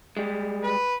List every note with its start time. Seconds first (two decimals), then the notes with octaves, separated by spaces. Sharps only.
0.17 G3 G#3
0.63 B4